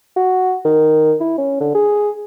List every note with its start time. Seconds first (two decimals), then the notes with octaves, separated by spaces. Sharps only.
0.16 F#4
0.65 D#3
1.20 E4
1.38 C#4
1.60 D3
1.74 G#4